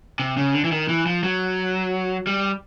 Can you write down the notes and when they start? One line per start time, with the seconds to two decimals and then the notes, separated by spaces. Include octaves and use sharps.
0.19 C3
0.37 C#3
0.54 D3
0.64 E3
0.72 D#3
0.89 E3
1.06 F3
1.23 F#3
2.27 G3